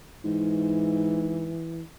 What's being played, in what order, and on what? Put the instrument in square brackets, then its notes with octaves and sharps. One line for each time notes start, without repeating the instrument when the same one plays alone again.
[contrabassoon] G#2 [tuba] E3